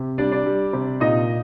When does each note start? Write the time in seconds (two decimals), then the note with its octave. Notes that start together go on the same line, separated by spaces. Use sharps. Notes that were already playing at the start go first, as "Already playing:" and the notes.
Already playing: C3
0.18 G3 D4 D5
0.32 D4 D5
0.46 G3
0.73 C3
1.00 A#2 D#4 D#5